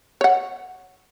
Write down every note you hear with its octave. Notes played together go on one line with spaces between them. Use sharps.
C#5 F#5